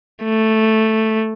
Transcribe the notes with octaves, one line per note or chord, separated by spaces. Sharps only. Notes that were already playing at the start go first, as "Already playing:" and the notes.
A3